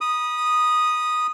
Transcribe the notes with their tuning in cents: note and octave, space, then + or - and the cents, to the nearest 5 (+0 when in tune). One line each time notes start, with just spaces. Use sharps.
B5 -30 D#6 -5